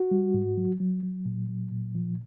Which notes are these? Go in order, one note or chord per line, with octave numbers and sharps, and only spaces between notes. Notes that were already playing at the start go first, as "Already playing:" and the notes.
Already playing: F#4
G3
G#2
F#3
F#3
F#3
A#2
F#3
A#2
F3